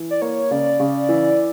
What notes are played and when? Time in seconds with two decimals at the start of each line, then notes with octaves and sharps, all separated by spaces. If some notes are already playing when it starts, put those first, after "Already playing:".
Already playing: E3
0.11 D5
0.21 A#3 C#5
0.51 C#3 D5
0.80 C#3
1.09 E3